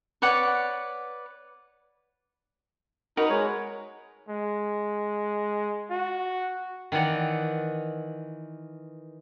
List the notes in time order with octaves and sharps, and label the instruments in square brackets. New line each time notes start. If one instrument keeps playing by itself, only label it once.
[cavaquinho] B4 C#5 D5 F#5
[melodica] D#4 [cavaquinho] F#4 A#4 B4
[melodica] G#3 C#5
[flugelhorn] G#3
F#4
[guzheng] D#3 E3 D5 F#5